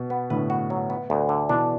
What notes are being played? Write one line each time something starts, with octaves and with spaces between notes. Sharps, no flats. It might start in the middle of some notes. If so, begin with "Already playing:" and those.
Already playing: B2
B3
A2 D3 B4
F#4
F#3
B3
D2
D3
B2 E3 D4